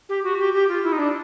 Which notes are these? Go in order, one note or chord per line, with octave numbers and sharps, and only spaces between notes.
G4
F#4
G4
G4
F4
E4
D#4
D4